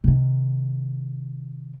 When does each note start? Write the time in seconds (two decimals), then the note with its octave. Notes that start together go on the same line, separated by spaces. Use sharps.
0.04 C3 D#3